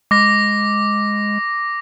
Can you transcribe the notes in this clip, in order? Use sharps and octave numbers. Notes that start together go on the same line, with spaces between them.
G#3 D6 A#6